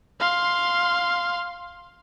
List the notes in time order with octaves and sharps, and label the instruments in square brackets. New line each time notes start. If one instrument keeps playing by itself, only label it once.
[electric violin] F5 C6